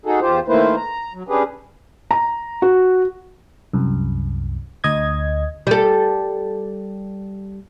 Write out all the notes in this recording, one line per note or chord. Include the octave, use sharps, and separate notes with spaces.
D#4 F#4 G#4 A4
E2 F4 G4 C5
D#3 A3 A#3 E4 B4 C5
A#5
F#3
C#4 D4 G4 G#4 B4
A#5
F#4
C2 F#2
D2 D#5 G#6
G3 A4